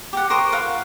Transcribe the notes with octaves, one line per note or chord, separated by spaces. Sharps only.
G4 F#5
A#4 C5 C#6 D#6
F4 B4 F5 F#5